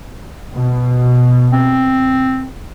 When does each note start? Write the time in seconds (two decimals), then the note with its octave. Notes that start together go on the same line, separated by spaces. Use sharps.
0.54 B2
1.53 C4